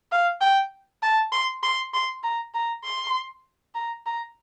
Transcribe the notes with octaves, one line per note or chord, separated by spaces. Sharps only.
F5
G5
A5
C6
C6
C6
A#5
A#5
C6
A#5
A#5